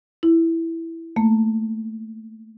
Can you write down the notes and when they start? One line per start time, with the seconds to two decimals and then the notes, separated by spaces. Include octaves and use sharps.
0.23 E4
1.16 A3 A#3